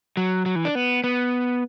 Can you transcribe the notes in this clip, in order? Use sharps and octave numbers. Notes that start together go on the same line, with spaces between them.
F#3
F#3
E3
D4
B3
B3